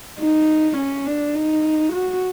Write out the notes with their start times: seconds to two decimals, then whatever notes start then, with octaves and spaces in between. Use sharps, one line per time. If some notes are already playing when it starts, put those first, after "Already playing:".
0.19 D#4
0.77 C#4
1.06 D4
1.35 D#4
1.93 F#4